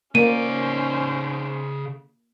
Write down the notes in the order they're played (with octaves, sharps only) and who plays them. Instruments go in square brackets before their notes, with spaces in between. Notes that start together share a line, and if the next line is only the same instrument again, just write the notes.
[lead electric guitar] C#3 D5 [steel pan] A#3 [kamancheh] C#4 C5 [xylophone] D#7